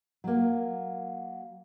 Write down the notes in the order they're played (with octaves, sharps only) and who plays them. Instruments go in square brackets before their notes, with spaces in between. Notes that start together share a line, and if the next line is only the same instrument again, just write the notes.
[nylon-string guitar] F#3 A#3